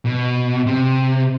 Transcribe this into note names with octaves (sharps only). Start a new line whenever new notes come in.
B2
C3